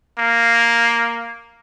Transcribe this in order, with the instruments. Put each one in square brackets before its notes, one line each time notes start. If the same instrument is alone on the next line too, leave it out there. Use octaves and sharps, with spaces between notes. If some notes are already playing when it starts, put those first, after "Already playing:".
[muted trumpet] A#3